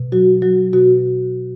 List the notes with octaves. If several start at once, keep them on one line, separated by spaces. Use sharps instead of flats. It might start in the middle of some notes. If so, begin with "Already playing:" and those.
Already playing: B2
F#3 F#4
F#3 F#4
B2 F#4